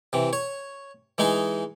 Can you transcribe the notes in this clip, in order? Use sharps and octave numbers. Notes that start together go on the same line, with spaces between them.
C3 E3
C#5
E3 G#3 D#4 G#4